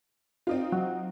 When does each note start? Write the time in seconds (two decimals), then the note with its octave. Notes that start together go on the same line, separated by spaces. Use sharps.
0.47 C4 D#4 F4
0.72 F#3